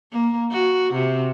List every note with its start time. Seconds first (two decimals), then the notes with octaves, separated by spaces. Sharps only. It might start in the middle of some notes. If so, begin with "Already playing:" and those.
0.12 A#3
0.51 F#4
0.93 C3